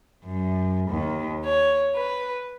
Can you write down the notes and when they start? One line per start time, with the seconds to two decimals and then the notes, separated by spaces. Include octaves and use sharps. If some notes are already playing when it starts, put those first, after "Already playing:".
0.24 F#2
0.89 D#2
1.45 C#5
1.95 B4